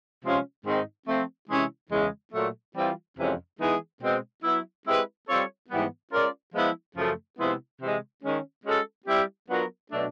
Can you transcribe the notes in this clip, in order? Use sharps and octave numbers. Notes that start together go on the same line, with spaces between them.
C3 F3 G#3 C#4 F4
G#2 D#3 G#3 C4 D#4
F3 A3 C4
C3 E3 G#3 C#4 E4
E2 C#3 E3 G#3
A#2 F#3 A3
E3 G3 C4 F4
F2 C3 E3 G#3 C#4
E3 G#3 B3 D#4 G#4
B2 G#3 C4
F#3 B3 E4
G#3 C4 E4 G4 B4
G3 C4 F4 A4 C#5
G#2 E3 G3 B3
G#3 C#4 F4 A#4 D5
F3 G#3 B3 E4
F#2 C#3 F3 A3
C3 F3 G#3 B3 E4
C3 E3 G#3
D#3 G#3 C#4
G#3 C#4 F#4 A4
G3 C4 E4 G4
F#3 B3 D4 F4 A#4
B2 F#3 A3 D4